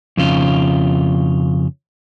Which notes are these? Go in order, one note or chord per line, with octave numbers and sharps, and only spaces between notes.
F2 C#3 F4